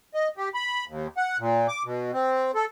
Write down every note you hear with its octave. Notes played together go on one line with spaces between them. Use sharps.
D#5
G4
B5
D#2
F#5
A#2
D6
B2
C4
A4